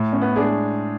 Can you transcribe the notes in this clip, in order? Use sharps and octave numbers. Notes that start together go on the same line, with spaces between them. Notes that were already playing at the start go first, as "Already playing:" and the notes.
Already playing: A2
C#4
B3
G#3 D4 G#4